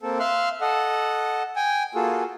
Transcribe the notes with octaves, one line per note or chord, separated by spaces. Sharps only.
A#3 C4 A4
E5 F5 C6 F#6
A4 D#5 F#5
G5 G#5
A#3 F4 F#4 G#4 A4